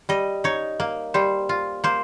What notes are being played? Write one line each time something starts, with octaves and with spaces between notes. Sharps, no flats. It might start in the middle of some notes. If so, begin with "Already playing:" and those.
G3 D#5
D#4 C#5
A#3
G3 C5
F4
A#3 C5